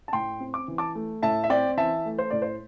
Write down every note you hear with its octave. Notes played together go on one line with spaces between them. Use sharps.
A5
A2 G5 C6
C4
D6
E3
A5 D6
A3
A2 E5 A5
E5
C4 D5 G5
E3 E5 A5
A3
C5
A2 D5
C5